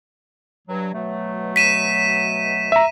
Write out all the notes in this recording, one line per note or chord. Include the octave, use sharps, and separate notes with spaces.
G2 F#3
B2 F#3 A3
B6 D#7 E7
E5 A#5